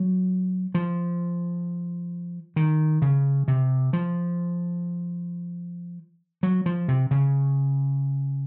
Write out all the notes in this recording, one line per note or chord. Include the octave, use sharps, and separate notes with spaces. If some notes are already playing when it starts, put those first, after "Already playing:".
Already playing: F#3
F3
D#3
C#3
C3
F3
F#3
F3
C3
C#3